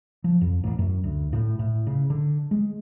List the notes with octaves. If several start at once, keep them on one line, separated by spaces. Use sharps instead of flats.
F3
F2
A1
F#2
D2
A2
A2
C#3
D3
G#3